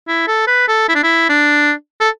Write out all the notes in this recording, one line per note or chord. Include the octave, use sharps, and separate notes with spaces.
E4
A4
B4
A4
E4
D4
E4
D4
A4